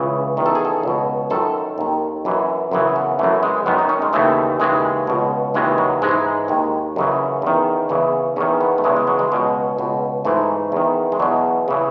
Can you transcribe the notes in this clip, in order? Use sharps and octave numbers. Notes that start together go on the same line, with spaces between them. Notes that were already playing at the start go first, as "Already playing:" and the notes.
Already playing: C#2 C#3 E3
E2 D#3
A4
G#4
A4
C#2 B2
F#2 D#3 A4
D#2 D#3
F#2 E3
F#2 C#3 E3
B3
F#2 E3 A3
G#3
F#2 D#3 B3
D#4
C#4
G#3
D#2 C#3 E3 A3
D#2 C#3 E3 G#3
C#2 B2
D#2 C#3 E3 G#3
F#3
G#2 E3 G#3
D#2 D#3
F#2 C#3 E3
E2 D#3
E2 C#3 E3
E2 D#3 C#4
B3
A3
E2 C#3 E3 G#3
G#3
F#3
G#3
C#2 B2
C#2 B2
G#2 E3 A3
E2 D#3
G#3
E2 B2 F#3
C#3 E3